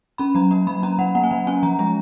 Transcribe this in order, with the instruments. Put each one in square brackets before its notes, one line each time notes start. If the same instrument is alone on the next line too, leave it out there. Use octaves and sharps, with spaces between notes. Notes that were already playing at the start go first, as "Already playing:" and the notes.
[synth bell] C#4 B5
F#3 A#5
A#3 A#5
F#3 B5
C#4 A#5
F#3 F#5
A#3 F#5
G#5
F#3 F#5
C#4 G#5
F3 A#5
G#3 A#5